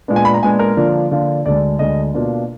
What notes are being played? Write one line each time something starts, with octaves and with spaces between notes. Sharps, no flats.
A#2 G#3 B3 D4
G#5
B5
A#5
A#2 G#3 B3 D4 G#5
A#4
D3 F3 A#3 D4 F4
D3 F3 A#3 D4 F4
D2 D3 G#3 D5
D2 D3 G#3 D#5
B2 A#3 D4 F4